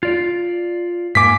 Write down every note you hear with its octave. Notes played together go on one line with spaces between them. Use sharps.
F4 D5
G#2 A#3 G#5 D6 B6